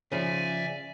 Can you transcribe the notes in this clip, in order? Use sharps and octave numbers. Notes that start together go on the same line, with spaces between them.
C#3 F3 D5 E5 G#5